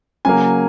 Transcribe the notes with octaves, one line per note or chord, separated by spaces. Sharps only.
C#3 F#3 A#3 G#5